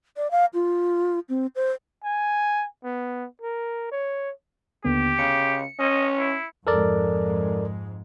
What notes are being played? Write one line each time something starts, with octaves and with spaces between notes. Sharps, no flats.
D5
F5
F4
C4
C5
G#5
B3
A#4
C#5
D#2 D3 B3 G4
C#3 C#7
C#4 D#5
E4
F2 G#2 G#3 A4 A#4 D5